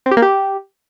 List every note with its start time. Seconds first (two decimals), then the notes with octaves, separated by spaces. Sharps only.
0.06 C4
0.11 G4
0.17 A#3
0.22 G4